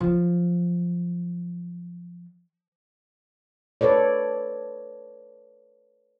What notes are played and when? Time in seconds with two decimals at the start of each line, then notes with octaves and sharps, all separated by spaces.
0.01 F3 F#3
3.81 A4 B4 C#5 D5